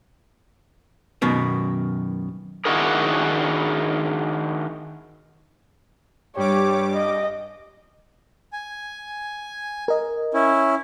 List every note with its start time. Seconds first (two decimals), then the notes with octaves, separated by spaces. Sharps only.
1.22 F#2 B2 D#3
2.65 D#3 D4 E4 F#4 G#4 A#4
6.37 G2 G3 G4 C#5 D6
6.94 D#5
8.53 G#5
9.88 A#4 D#5
10.34 C#4 E4